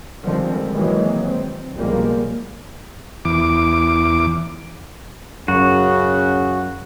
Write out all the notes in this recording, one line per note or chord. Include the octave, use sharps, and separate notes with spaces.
D3 D#3 F3 G3 G#3 C4
C3 D#3 E3 F#3 G#3 A#3
C4
F#1 B1 F3 G3 G#3 A#3
E2 D6
F#2 C#3 F#4